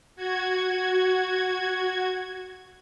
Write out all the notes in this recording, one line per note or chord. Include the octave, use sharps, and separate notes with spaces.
F#4 G#6